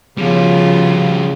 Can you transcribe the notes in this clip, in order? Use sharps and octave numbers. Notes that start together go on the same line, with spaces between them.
C#3 F3 G3 B3 F4